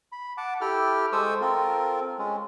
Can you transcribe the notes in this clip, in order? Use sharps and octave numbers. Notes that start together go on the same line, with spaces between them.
B5
F#5 A5 D6
E4 G4 A4 G5 F6
G#3 A4 C5 C#6 D#6 E6
C4 F4 A4 A#4
G#3 C#4